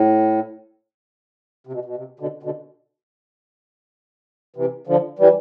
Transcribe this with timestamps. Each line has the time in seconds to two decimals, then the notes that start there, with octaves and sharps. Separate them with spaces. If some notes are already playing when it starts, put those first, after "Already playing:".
Already playing: A2
1.67 C3
1.73 B2
1.85 B2
1.96 C3
2.20 B2 D3
2.43 B2 D3
4.56 C3 E3
4.87 D3 F3
5.19 E3 G3